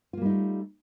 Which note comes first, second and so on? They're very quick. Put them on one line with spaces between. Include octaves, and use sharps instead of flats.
F4 A#3 G3 D#4 A3